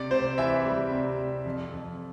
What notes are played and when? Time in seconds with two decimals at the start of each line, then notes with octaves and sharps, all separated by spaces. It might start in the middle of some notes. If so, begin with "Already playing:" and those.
Already playing: C3 D5
0.11 C3 C5
0.38 E3 E5
0.65 G3
0.91 C3
1.18 C3
1.46 F2
1.72 F2